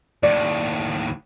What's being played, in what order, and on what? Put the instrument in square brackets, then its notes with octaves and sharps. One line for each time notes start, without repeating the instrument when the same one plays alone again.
[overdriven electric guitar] D#2 A2 [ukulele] D5